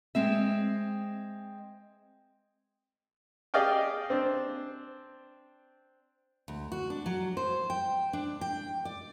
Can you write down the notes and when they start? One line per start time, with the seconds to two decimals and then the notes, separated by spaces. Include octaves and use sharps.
0.15 G#3 C4 E5
3.54 G4 G#4 D5 D#5 F5 G5
4.10 C4 D4
6.48 D2
6.72 F#4
6.90 D4
7.06 F#3
7.37 C5
7.70 G5
8.13 D4
8.41 G5
8.85 D5